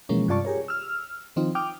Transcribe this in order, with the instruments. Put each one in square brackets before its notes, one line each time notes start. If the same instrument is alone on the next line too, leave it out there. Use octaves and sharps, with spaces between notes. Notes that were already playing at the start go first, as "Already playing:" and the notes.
[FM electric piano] B2 E3 F3 G#3 A#3 C#4
G2 C3 F4 D5 A5 C#6
G4 G#4 A#4 C#5
E6 F6
D#3 F3 C4 D#4 F4
G5 D6 D#6 F6